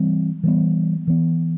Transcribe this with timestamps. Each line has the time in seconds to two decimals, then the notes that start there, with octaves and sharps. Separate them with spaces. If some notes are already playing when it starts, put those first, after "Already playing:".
Already playing: E3 G3 C4
0.43 E3 G3 B3
1.07 E3 B3